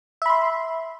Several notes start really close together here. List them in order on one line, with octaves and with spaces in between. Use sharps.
E5 B5 C6